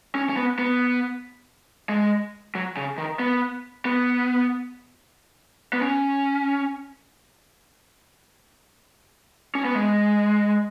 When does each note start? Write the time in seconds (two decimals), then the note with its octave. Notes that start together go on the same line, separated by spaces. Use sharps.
0.15 C#4
0.29 C#4
0.37 B3
0.59 B3
1.89 G#3
2.55 F#3
2.77 C#3
2.98 D#3
3.19 B3
3.85 B3
5.73 B3
5.82 C#4
9.55 C#4
9.65 B3
9.75 G#3